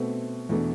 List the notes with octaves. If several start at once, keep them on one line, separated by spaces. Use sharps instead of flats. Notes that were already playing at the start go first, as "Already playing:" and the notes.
Already playing: B2 A3 C4
E2 B2 A3 D4